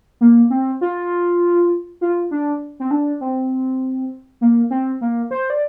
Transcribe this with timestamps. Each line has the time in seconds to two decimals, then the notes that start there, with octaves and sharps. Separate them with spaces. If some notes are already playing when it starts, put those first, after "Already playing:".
0.21 A#3
0.50 C4
0.81 F4
2.01 F4
2.31 D4
2.80 C4
2.91 D4
3.21 C4
4.41 A#3
4.71 C4
5.01 A#3
5.31 C5
5.50 D5